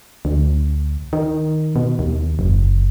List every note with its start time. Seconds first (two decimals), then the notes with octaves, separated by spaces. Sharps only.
0.25 D2
1.13 D#3
1.76 B2
1.99 D#2
2.39 F#1